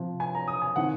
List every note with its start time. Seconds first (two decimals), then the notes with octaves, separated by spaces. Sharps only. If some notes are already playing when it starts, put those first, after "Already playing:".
Already playing: C3 F3
0.20 G#5
0.35 A#5
0.48 D#6
0.62 G#5
0.76 C3 D#3 F#5